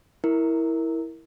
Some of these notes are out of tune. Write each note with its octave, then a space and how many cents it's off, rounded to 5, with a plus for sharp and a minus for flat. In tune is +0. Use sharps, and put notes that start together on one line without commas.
E4 -10 A#4 +0